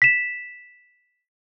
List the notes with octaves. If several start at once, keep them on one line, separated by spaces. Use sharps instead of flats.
B6 E7